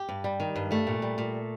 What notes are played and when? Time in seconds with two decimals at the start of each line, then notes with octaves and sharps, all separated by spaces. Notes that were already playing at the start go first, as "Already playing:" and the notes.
Already playing: G4
0.09 G2
0.24 G3
0.40 D#3
0.56 G2
0.71 G3 A3
0.87 A#2
1.02 G3
1.18 A#2